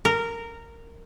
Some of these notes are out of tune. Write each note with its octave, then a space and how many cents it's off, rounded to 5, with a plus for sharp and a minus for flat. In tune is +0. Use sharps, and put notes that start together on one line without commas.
A#4 -15